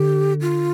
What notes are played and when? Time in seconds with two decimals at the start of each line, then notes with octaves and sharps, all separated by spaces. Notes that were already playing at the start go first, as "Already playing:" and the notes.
Already playing: D3 G4
0.41 F4